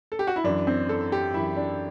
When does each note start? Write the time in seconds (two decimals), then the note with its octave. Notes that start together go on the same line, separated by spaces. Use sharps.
0.12 A4
0.19 G4
0.27 F#4
0.36 E4
0.44 F#2 E3 D4
0.67 C4
0.89 A4
1.12 G4
1.34 F#2 E3 E4
1.56 D4